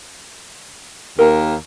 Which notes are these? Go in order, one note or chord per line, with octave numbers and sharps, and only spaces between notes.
D#2 A#4